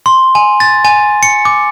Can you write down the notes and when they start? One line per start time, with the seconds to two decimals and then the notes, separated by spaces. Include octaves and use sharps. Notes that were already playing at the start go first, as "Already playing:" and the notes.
0.06 C6
0.35 G#5
0.60 A6
0.85 G#5
1.23 C#7
1.45 D6